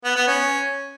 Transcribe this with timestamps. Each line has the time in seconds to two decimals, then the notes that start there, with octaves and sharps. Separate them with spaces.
0.05 B3
0.16 B3
0.28 C#4